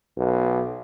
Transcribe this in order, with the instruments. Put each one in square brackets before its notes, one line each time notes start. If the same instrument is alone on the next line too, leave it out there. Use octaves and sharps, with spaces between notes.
[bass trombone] B1